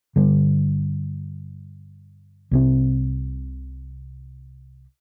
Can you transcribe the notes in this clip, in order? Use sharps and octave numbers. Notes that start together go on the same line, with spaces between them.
G2 D3 G3
C2 C3 G3 C4